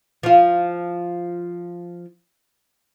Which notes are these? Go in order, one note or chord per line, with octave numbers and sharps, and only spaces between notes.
F3 F4